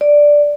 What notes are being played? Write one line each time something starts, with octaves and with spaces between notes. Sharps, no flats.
D5